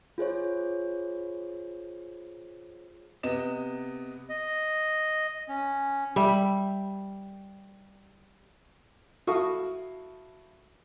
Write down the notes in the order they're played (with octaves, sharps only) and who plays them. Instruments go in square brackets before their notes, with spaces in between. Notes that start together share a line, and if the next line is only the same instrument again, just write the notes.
[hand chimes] F4 G#4 C5 C#5
[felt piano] C3 B3 D#5 E7
[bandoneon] D#5
C#4
[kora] G3 E5
[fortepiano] E4 F#4 A4 F5 C#6 D#6